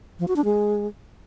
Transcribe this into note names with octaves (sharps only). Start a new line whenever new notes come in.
F3
F#4
D4
G#3